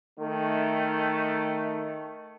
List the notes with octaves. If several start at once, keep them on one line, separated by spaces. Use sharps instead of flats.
D#3 A3